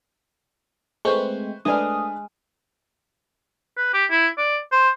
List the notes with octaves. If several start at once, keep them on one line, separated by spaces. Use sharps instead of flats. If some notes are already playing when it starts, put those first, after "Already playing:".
G#3 A3 C4 B4 C5 C#6
G#3 A3 D4 B4 D5 G#5 D#6 F6
B4
G4
E4
D5
C5